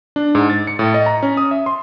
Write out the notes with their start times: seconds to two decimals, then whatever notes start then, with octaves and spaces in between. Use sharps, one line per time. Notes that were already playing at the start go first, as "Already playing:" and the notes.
0.16 D4
0.35 G#2
0.50 A6
0.67 C#7
0.79 A2
0.94 D#5
1.06 A#5
1.23 C#4
1.37 D#6
1.51 E5
1.66 C6